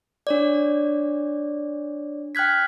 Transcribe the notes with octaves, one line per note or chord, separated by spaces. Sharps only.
D4 C#5 D5
G5 F6 F#6 G#6 B6